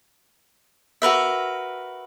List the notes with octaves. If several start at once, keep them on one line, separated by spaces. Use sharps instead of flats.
F#4 A#4 B4 E5